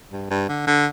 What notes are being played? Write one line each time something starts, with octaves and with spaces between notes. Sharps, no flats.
G2
G2
D3
D3